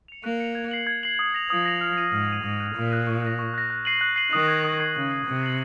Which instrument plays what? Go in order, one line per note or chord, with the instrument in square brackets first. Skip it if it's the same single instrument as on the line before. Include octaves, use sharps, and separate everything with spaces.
[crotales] C#7 F7
[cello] A#3 [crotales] F#6
[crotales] C#7 F7
G#6
C7 F#7
G#6
C7 F#7
D#6
A#6 F7
[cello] F3 [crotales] D#6
[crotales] A#6 F7
F6
C7 D#7
[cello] G#2 [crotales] F6
[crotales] C7 D#7
[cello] G#2 [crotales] D#6
[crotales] F#6 A#6 D#7
[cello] A#2 [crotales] D#6
[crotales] F#6 A#6 D#7
C#6
F#6 A#6
C#6
F#6 A#6
F#6
C7 D#7 F#7
F#6
C7 D#7 F#7
[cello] D#3 [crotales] D#6
[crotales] G#6 C7
D#6
G#6 C7
[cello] C#3 [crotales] G#6
[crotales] C7 F#7
[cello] C3 [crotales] G#6
[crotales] C7 F#7